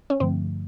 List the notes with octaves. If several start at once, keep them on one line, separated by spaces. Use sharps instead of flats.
C#4
G2 D3 F3 A3 C4